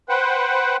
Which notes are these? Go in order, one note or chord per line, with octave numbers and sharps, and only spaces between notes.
B4 C5 F#5 G5